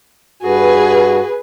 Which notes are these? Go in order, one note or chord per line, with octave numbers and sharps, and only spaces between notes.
G2 F#4 G#4 B4